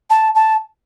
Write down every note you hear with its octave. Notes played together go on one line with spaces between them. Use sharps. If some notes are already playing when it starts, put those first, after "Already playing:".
A5
A5